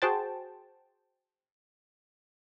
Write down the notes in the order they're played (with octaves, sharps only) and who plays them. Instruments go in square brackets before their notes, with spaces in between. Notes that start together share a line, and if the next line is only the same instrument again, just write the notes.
[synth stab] F#4 G#4 C5 G5 A5